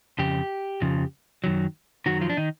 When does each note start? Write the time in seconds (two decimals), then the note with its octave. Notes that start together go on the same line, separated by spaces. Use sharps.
0.18 F2 C#3 G4
0.82 F2 C#3 F3
1.44 F#2 D#3 F#3
2.06 F#2 D#3 F#3 F#4
2.21 F3 F4
2.30 D4
2.37 D#3 D#4